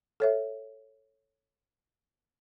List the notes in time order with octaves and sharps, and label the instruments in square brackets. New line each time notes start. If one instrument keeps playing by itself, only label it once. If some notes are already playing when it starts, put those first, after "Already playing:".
[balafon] A4 C#5 E5